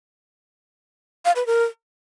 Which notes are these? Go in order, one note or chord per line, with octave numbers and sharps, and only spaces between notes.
F5
B4
A#4